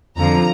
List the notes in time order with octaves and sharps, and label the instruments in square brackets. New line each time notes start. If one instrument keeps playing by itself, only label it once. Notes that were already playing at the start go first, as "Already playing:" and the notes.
[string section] F2 D3 F3 A#5